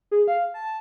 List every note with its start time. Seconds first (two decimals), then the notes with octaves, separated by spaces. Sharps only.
0.11 G#4
0.28 F5
0.54 A5